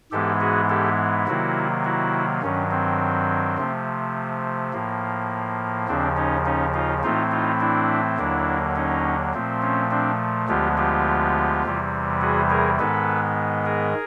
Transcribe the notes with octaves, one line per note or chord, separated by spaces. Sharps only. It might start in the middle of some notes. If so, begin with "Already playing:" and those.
G#2 E3 G#3 B3 G4 A4
F#4 G#4
G4 A4
C3 D#3 F#3 A#3 E4 F#4
E4 F#4
G2 D#3 F#3 C#4
C4
C3 F3 A3
A2 F3 A#3
D#2 C#3 F3 C4 D4
C#4 D#4
C#4 D#4
D#4 F4
A2 E3 A3 C4 D#4 F4
D#4 F4
D4 E4
D#2 D3 F#3 A#3 D4 E4
C#4 D#4
A#2 F3 A3 C4
C#4
C4 D4
D2 D3 F3 G#3 B3 F4 G4
F4 G4
E2 C3 E3 G3
F#4 G#4
G#4 A#4
G#2 D#3 G#3 B3 A4 B4
G#4 A#4